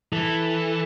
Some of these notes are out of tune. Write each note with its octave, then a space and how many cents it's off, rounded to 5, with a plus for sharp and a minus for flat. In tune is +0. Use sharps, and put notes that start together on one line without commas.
E3 +0 A4 +0